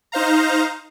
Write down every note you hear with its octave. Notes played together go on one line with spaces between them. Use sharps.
D#4 C5 F5 A#5